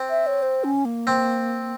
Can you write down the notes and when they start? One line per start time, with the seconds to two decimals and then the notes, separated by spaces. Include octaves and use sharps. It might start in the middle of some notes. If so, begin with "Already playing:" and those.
Already playing: C4
0.10 E5
0.27 C#5
0.42 C5
0.64 C#4
0.85 A#3
1.07 C4